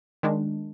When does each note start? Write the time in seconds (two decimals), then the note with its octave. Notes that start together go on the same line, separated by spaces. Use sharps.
0.23 D#3 G#3 D4